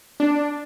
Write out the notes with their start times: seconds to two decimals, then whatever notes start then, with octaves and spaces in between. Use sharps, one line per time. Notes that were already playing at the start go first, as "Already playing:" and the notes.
0.20 D4